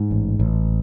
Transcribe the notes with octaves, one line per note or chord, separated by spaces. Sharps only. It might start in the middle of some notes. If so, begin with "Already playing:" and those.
Already playing: G#2
A1
A1